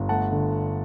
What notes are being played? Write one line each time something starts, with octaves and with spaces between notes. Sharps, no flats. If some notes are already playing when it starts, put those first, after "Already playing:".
Already playing: G1
A3 F#5 A5
D3